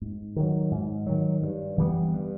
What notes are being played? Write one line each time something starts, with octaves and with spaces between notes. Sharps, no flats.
G#2
D#3 F#3
G#2
D#3 F#3
G2
E3 G3 B3
G2